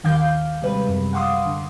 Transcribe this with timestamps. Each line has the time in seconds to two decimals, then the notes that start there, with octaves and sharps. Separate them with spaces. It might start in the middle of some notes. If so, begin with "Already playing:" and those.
0.03 A#1 D#2 D#3 F5 D6 G6
0.16 F5
0.62 C3 G3 G#3 B4
0.86 F#2 C3
1.13 F5 F#5 C6 D6 D#6
1.45 D3